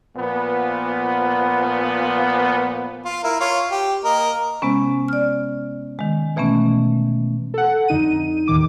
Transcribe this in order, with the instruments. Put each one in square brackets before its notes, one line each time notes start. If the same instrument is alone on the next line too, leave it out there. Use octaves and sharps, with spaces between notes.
[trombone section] A#2 F3 B3
[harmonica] F4
E4 A#4
F4 C#5
G4
A#3 A#4 D#5
[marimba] C3 G#3 B3 C#4
D5 F6
D#3 G#3
B2 E3 A3 B3 C#4
[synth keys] A4 F#5
F2 D3 D#4 D#7
D#2 A2 D#3 D6